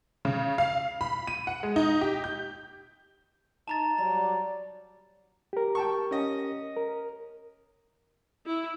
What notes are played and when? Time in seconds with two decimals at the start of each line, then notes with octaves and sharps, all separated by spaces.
0.25 C#3
0.58 F5
1.01 B5
1.27 D#7
1.47 F#5
1.63 G#3
1.76 D#4
2.01 G4
2.24 G6
3.68 D#4 A5 A#5 A6
3.98 F#3 G3 D5 A#5
5.53 G4 A#4
5.75 G5 A5 C#6
6.11 C#4 D#5
6.77 A#4
8.46 E4